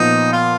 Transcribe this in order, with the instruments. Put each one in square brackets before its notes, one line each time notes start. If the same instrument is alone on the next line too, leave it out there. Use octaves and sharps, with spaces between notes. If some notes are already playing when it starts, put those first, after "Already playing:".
Already playing: [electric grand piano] A#2 F3 B3 [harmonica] D#4
[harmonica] F4